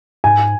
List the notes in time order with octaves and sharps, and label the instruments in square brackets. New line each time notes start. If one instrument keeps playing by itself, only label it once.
[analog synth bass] G#2 [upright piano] G#5